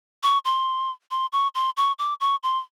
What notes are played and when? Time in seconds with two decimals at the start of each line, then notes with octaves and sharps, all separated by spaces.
0.23 C#6
0.45 C6
1.11 C6
1.32 C#6
1.55 C6
1.77 C#6
1.99 D6
2.21 C#6
2.43 C6